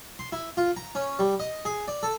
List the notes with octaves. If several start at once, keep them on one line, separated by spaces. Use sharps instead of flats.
C6
E4
F4
A#5
C#4
G3
D#5
G#4
D5
A4